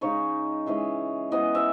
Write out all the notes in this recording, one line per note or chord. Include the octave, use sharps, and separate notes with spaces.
C#3 G#3 D#4 C#5
E3 G#3 C#4
E3 G#3 B3 D#5
E5